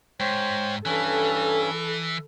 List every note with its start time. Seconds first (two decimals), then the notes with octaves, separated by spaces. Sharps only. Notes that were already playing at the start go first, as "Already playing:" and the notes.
0.20 G#2 C5 C#5 G5
0.86 G2 E3 C#4 A4